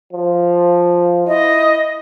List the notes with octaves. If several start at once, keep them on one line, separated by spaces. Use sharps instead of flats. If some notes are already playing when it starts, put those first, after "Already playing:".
F3
E4 D#5